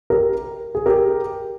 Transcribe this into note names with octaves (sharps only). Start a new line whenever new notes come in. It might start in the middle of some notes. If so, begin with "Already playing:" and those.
G4 A#4
G#4
G4 A#4